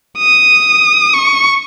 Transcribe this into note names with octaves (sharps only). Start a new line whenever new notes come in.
D#6
C#6